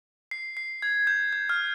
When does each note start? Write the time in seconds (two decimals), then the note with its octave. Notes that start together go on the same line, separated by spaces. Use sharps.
0.31 C7
0.57 C7
0.82 G#6
1.07 G6
1.33 G6
1.49 F6